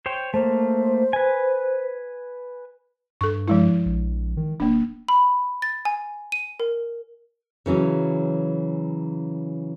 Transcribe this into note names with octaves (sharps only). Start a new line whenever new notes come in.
C5 C#5 G5
A3 A#3 C5
B4 G#5
G2 A4 C#6
F3 G#3 E4
A#1
D#3
D1 A#3 D4
B5
A6
G#5
D#7
A#4
C#3 E3 F#3 C#4